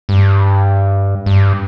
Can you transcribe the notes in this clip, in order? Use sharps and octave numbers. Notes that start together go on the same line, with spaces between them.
G2
G2